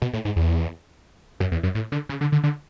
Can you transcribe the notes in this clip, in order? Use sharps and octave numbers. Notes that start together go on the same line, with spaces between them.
B2
A2
G#2
E2
F#2
E2
F#2
A2
D3
C#3
D3
D3
D3